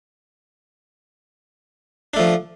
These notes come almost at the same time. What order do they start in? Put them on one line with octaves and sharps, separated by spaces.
D4 A3 F3